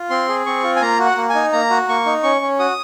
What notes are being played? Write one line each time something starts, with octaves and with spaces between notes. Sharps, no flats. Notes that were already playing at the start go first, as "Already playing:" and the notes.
Already playing: F4
C4 C6
G#4
C4 C#6
F4
G#5
A#3 A#5
F#4
F#5
A#3
G#5
D#4
A#3 A#5
F#4
A#3 C#6
D#4
C#4 C#6
C#4
F#4 D#6